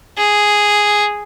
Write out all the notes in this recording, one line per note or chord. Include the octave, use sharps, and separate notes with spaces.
G#4